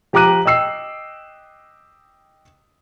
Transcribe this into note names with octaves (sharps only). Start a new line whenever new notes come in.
F3 G4 A#5 D6 F#6 D#7
D#5 G5 E6 C7